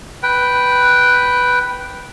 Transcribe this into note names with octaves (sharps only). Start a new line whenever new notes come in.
B4 G5